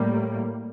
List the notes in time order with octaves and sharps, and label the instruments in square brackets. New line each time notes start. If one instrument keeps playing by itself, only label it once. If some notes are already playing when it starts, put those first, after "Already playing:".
Already playing: [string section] A2 G3 A#3